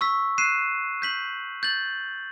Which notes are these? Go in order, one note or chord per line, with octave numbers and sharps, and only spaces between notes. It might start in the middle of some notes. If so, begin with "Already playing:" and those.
C#6 E6 B6
F#6 C7 D#7 E7
G6 B6 F#7
G6 A6 F#7